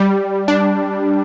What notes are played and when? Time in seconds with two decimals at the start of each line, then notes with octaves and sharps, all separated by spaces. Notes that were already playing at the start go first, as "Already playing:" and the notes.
Already playing: G3
0.48 D4